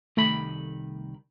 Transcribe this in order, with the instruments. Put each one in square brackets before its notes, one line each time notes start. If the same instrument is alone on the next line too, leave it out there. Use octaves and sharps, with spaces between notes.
[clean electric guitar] C2 D#3 B5 [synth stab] A3